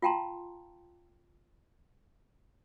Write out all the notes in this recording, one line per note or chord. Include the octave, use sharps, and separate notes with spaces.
F4 F5 G5 A5 A#5 C6